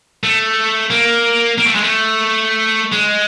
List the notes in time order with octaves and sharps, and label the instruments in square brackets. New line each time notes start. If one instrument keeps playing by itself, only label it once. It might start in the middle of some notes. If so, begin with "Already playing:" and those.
[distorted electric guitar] A3
A#3
A#3
A3
G#3
A3
G#3